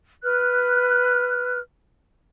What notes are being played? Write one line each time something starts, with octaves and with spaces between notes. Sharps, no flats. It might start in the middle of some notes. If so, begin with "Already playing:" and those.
B4 F6 F#6